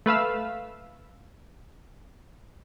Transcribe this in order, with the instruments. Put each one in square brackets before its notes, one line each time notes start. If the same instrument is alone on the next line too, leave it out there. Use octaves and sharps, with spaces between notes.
[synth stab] A3 B4 F5 E6